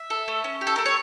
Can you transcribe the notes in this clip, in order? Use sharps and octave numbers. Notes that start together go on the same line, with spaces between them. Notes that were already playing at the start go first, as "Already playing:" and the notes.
Already playing: E5
A4
A3
C#4
G4
A4
A3 A#4
C#5